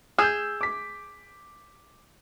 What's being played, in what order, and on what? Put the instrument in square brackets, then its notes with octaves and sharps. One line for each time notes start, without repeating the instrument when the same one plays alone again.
[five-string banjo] G#4 [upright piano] E6 G6
[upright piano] D6 B6